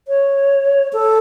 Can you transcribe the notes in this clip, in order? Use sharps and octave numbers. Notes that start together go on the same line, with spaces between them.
C#5
A4